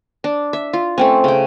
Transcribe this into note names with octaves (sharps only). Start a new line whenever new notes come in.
D4
E5
F4
A3 C4 C#4
C#3 G5